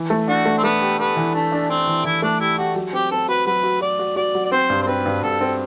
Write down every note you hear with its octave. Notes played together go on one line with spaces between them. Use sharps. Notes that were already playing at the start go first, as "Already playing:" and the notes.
Already playing: E3
A3
D4 F#4
A3
C4
A3 B3
G4
B3 G4
E3
A3 D4
D4
C4 D4
E3
E3 E4
A3 D4
E4 G4
F#4 G4
F#3
C4 G4
C4 A4
F#4 B4
F#3 B4
F#4
F#4 D5
F#4
F#4 D5
F#3
D5
C4 C5
G2
C5
C4 B4
G2
G2 A4
C4